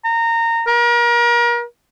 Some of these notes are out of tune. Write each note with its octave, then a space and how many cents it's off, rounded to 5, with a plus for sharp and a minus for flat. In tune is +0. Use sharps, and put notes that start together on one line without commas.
A#5 -20
A#4 +35